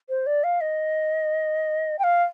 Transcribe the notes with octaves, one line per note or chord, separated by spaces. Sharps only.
C5
D5
F5
D#5
G5
F5